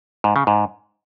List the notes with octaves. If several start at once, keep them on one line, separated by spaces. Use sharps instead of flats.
G#2
C#3
G#2